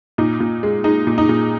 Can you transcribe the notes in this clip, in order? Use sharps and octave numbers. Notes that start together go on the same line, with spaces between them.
A#2 D#4
A#2
G#3
G#3 D#4
A#2
D#4
A#2